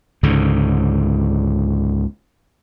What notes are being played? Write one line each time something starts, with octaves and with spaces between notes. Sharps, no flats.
C#2 G#2 D3